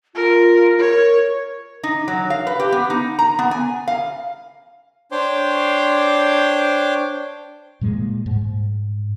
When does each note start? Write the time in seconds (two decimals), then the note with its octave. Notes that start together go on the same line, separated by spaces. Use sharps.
0.15 F4 A#4
0.79 A#4 C#5
1.83 D#4
2.08 F#3
2.30 F5
2.47 B4
2.60 G4
2.72 B3
2.90 D#4
3.19 A#5
3.39 B3
3.51 G#5
3.88 F5
5.12 D4 C5 C#5 G5 C6 D6
7.81 A#2 G3 G#3
8.26 G#2